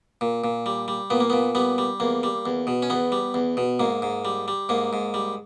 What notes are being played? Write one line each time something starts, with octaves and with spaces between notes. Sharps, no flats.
A#2
A#2
G3
G3
A#2 B3
A#3
A#2 B3
G3 B3
G3
E2 A#3
G3
E2
B2
C#4
E2 B3
G3
E2
B2
G#2 A#3
G#2
G3
G3
G#2 A#3
G#2
G3